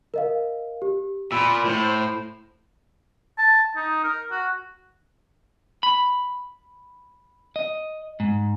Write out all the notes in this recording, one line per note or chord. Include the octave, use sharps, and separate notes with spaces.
A#4 D#5 F5
G4
A#2 B5 E6
A2 C5
A5
D#4
A#4
F#4
B5
D#5
G#2